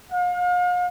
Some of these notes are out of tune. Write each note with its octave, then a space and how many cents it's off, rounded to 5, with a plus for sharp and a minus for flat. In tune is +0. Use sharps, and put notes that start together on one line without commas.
F5 +40